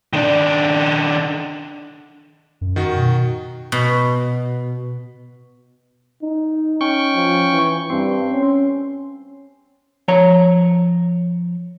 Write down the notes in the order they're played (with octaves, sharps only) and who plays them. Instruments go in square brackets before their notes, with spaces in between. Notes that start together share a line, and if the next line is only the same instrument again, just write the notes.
[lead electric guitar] D#3 D4
[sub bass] F#2
[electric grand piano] D#3 F#4
[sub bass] B2
[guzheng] B2
[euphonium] D#4
[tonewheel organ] C#4 G5 C#6
[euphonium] F3
E3
[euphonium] G2 [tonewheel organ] C4
[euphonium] C#4
[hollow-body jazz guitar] F3 C#5 A#5